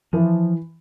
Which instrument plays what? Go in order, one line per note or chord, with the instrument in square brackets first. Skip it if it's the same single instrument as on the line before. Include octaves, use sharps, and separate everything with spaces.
[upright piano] E3 [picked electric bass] F3